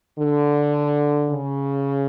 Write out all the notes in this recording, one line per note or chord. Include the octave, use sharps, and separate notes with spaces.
D3
C#3